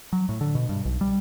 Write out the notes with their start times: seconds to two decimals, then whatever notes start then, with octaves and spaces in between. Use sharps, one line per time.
0.13 F#3
0.29 A2
0.41 D3
0.55 B2
0.69 G2
0.85 B1
1.01 G3